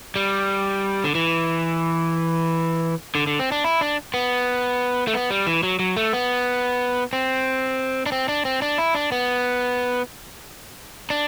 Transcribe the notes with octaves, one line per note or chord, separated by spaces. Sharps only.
G3
D3
E3
D3
D3
C4
D4
E4
D4
B3
A3
B3
G3
E3
F#3
F#3
A3
B3
C4
D4
C4
D4
C4
D4
E4
D4
B3
D4